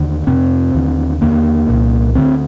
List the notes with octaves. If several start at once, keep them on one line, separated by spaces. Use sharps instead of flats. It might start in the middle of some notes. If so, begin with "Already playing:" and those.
Already playing: D#2 D3
F2 C3 C4
D#2 D3
D#2 D3 A#3
C2 A#2
D2 D3 C4